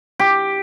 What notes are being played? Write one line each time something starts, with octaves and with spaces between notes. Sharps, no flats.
G4